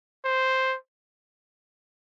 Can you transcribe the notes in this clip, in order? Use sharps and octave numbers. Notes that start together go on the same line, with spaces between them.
C5